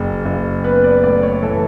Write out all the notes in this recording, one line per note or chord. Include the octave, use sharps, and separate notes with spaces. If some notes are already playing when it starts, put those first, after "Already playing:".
Already playing: F#1
F#1
B3 B4
D5
A2 D5
C#5
E3 A4